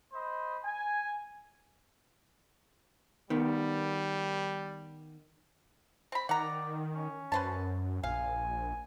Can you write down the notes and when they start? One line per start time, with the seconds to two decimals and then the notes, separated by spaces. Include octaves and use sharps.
0.13 C5 D#5 B5
0.64 G#5
3.30 D#3 G3 B3
6.12 C4 B5
6.29 D#3 D5 F#5 A#5
6.95 C#4
7.32 F#2 B4 C5 A5
8.03 A#1 F5 G#5